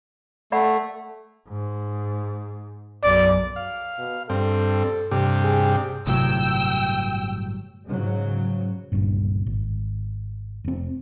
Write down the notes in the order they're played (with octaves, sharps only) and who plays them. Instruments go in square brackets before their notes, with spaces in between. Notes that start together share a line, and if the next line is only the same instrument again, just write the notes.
[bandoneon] A3 [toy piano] D5 F#5 B5
[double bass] G#2
[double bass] B1 F#2 [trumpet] D5
[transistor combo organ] F5
[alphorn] B2
[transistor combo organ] G2 C4 [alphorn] A4
[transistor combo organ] G2 C3 G4
[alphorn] G#4
[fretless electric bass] G1 A2 F#3 [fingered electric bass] C3 [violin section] G5 E6
[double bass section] G#2 C#3 F#3
[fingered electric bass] G1 C#2 G2 A#2
G#1
F1 C4